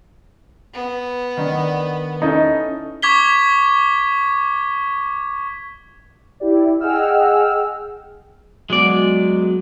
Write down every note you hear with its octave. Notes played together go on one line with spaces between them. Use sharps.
B3
D#3 D4 D#4
C#4 D#4 E4 A4
C#6 D6 G#6 B6 G7
E4 G4 D5
G#4 D#5 F#5 G5 E6 F6
F#3 G#3 B3 F#4 D5